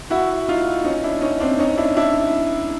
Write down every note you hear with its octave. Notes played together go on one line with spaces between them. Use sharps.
E4 F#4
D#4 F4
C#4 D#4
D4 E4
C#4 D#4
C4 D4
C#4 D#4
D4 E4
D4 E4